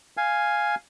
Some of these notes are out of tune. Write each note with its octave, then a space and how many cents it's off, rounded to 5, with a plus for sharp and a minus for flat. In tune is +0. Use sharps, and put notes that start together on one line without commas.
F5 +0 G#5 +0